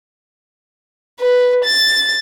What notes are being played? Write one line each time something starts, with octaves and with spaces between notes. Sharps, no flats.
B4
A6